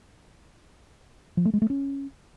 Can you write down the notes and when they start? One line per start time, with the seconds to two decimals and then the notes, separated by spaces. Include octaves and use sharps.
1.37 F3
1.45 A3
1.54 G#3
1.62 A3
1.70 C#4